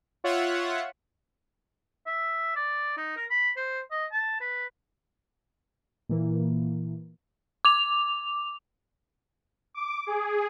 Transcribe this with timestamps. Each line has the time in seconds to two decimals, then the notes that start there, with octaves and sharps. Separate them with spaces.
0.24 F4 C#5 E5 F#5
2.06 E5
2.56 D5
2.97 D#4
3.16 A#4
3.30 B5
3.56 C5
3.91 D#5
4.12 A5
4.40 B4
6.09 A#2 E3 A#3
7.65 D6 F7
9.74 D6
10.07 G#4